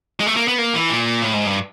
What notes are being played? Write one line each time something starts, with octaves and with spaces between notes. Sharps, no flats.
G#3
A3
A#3
B3
A#3
E3
A#2
A2
G#2
G2